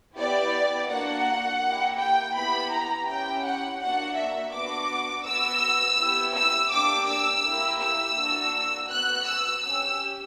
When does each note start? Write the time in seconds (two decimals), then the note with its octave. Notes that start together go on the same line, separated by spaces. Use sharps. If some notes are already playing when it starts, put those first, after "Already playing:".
0.17 B3 E4 G4 D5
0.89 A#3 D4 F#4 F#5
1.62 A#3 E4 G4
1.98 G5
2.35 B3 E4 G4 B5
2.71 A#5
3.07 C#4 E4 G4 G5
3.43 F#5
3.81 A#3 D4 F#4 F#5
4.16 E5
4.53 B3 D4 F#4 D6
5.26 B3 F#4 E6
5.98 B3 E4 G4
6.35 E6
6.71 A#3 D4 G4 D6
7.08 E6
7.44 A#3 E4 G4
7.80 E6
8.16 A#3 D4 F#4
8.89 B3 F#4 F#6
9.26 E6
9.62 C#4 G4 E6